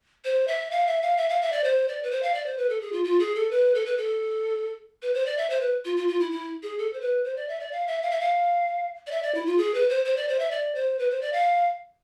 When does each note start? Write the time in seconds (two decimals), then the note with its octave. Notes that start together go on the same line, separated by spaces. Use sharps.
0.25 C5
0.48 E5
0.71 F5
0.87 E5
1.02 F5
1.17 E5
1.29 F5
1.42 E5
1.52 D5
1.64 C5
1.88 D5
2.03 B4
2.11 C5
2.23 F5
2.34 D5
2.46 C5
2.57 B4
2.69 A4
2.81 G#4
2.92 F4
3.05 F4
3.19 G#4
3.35 A4
3.51 B4
3.75 A4
3.86 B4
3.97 A4
5.02 B4
5.14 C5
5.26 D5
5.37 E5
5.50 C5
5.61 B4
5.85 F4
5.97 F4
6.09 F4
6.20 E4
6.31 E4
6.63 G#4
6.78 A4
6.93 C5
7.01 B4
7.24 C5
7.36 D5
7.48 E5
7.60 D5
7.72 F5
7.87 E5
8.02 F5
8.11 E5
8.20 F5
9.07 D5
9.11 E5
9.23 D5
9.35 E4
9.46 F4
9.58 G#4
9.74 B4
9.89 C5
10.05 C5
10.17 D5
10.28 C5
10.39 E5
10.51 D5
10.75 C5
10.99 B4
11.10 C5
11.21 D5
11.33 F5